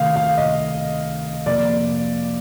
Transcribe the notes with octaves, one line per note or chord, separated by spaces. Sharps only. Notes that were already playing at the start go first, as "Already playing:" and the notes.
Already playing: C3 D#3 A3 F5
F5
D#5
F2 C3 F3 A#3 D5